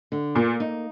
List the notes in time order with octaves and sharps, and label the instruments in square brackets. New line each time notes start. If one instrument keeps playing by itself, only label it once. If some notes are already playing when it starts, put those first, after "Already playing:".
[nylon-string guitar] D3
[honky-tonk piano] A#2 [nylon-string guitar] A#3
[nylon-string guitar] D#4